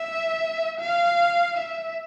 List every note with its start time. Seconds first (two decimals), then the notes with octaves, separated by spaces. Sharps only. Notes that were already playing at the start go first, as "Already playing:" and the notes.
Already playing: E5
0.80 F5
1.57 E5